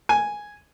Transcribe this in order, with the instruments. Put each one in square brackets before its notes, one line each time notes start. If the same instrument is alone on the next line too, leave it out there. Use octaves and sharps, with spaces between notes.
[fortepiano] G#5